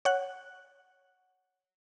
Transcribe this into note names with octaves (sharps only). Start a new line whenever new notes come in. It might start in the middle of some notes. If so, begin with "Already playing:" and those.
C#5 F#5 F#6